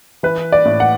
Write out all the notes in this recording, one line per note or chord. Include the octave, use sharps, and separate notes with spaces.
E3 B4
D5
A2
F#5